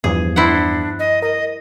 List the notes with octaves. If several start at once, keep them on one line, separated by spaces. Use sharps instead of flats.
E2 G2 F3 G#4
D4 E4 C5 F#5
D#5
A#4 D#5